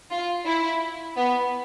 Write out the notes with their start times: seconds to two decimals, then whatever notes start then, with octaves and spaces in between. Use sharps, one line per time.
0.11 F4
0.46 E4
1.16 B3